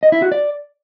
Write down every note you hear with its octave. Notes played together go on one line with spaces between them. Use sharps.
D#5
E4
F#4
D5